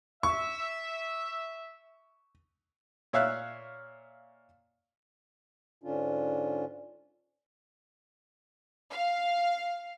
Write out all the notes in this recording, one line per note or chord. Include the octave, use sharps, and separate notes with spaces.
E5 C#6
A#2 C#5 E5 F5 E6 F#6
G#2 D3 C#4 D4 F4
F5